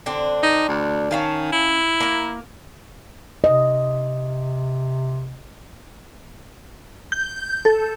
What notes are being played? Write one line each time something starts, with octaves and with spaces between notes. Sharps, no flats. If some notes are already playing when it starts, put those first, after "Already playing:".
D3 C4 D4
D#4
D2
D#3 C#4 F5 A5
E4
A#3 A#4
C3 D#5
G6
A4